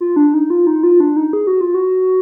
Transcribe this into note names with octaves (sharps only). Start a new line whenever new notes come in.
F4
D4
D#4
F4
D#4
F4
D4
D#4
G#4
F#4
F4
F#4